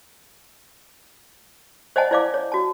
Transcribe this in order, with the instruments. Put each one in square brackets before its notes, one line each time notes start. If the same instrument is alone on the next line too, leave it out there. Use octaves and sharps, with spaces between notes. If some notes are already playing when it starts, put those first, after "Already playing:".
[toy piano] C5 D5 D#5 F#5 G#5 A5
E4 C5 D5 F5 D6
C#5
F#4 A5